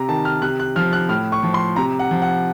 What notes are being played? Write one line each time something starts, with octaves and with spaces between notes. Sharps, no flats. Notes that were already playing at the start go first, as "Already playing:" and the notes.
Already playing: C3 A#5
D#3 A5
F6
C3 F#6
F#6
F3 F6
F#6
A2 F6
C#6
F3
C6
C3 A#5
F#5
F3
F#5